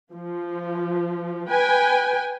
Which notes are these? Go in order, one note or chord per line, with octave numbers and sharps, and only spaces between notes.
F3
B4 G5 G#5